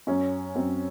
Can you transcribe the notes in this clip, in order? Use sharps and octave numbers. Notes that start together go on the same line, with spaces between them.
F#2 C#4
F#2 C4